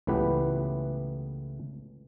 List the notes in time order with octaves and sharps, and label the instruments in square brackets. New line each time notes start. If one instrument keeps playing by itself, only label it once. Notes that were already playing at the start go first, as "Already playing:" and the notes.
[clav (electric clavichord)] C#2 A2 E3 B3 G4 B4